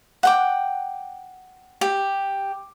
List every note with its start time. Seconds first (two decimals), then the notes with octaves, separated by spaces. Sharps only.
0.23 F#5 G5 D6
1.81 G4